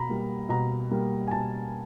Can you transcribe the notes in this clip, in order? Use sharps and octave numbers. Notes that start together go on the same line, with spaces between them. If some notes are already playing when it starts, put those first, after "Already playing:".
Already playing: B2 A#5 B5
G3 A#3
B2 A#5
G3 A#3
G#5
B2 A5